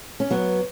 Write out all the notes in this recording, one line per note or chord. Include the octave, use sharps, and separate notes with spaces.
C#4
F#3 B3